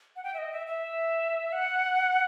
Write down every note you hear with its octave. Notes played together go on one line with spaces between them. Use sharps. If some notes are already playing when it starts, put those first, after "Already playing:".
F#5
G5
E5
D#5
E5
E5
F#5